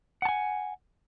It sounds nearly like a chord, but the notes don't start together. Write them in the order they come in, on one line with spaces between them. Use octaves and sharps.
F#5 A5 G#5